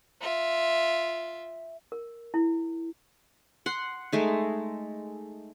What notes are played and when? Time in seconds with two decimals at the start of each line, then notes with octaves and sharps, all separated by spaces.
0.21 F4 E5
1.92 A#4
2.34 E4
3.66 F#5 C6
4.12 G#3 A3 D#4